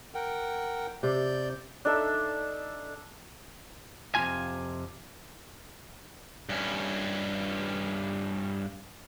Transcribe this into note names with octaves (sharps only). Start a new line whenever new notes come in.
A#4 F#5 G5
C3 D5 G6
D4 D#4 A4 E5
F2 C3 G#3 C#4 F4 G#5
G2 C#4